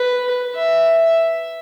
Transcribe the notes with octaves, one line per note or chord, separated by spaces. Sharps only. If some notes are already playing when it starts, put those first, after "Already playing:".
Already playing: B4
E5